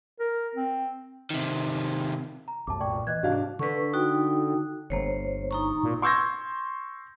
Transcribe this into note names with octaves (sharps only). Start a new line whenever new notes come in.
A#4
C4
C3 D#3
A#5
C2 F#2 A2 A5 D6
A#2 D5 G5 C#6
E3 D#5 F#6 G#6
G#2 C3 D4 F#4 F5
D3 B4 C#6
D#4 F#4 G5
G1 A#3 C5 C#5
D#4 A#5 C#6
A#2
C6 C#6 E6 G6 G#6 A#6